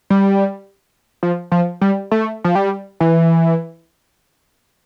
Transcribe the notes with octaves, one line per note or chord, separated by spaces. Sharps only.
G3
F3
F3
G3
A3
F3
G3
E3